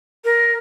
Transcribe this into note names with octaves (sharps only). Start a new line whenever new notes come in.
A#4